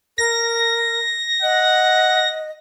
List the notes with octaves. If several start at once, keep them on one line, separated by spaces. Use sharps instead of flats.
A#4 A#6
D#5 F#5